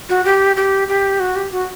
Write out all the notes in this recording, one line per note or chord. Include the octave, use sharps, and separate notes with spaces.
F#4
G4
G4
G4
F#4
G4
F#4